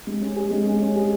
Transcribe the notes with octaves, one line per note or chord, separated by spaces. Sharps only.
G#3
C#4
G#4
G#3
G#3
C#4
G#4